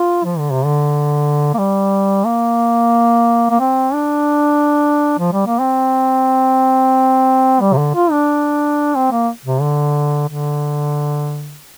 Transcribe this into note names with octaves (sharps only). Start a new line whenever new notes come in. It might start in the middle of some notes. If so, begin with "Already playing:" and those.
Already playing: F4
F3
D3
C3
D3
A#3
G3
A#3
A#3
C4
D4
F3
G3
A#3
C4
G3
C3
D3
F4
D4
C4
A#3
C3
D3
D3